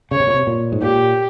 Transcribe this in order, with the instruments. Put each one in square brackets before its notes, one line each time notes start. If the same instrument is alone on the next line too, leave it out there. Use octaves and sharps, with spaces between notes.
[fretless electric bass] C#3 [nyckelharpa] C#5
[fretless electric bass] C3
A#2
C3
A#2
G#2
[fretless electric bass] A#2 [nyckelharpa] G4